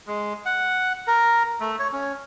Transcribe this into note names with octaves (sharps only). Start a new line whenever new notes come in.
G#3
F#5
A#4
A3
C#5
C#4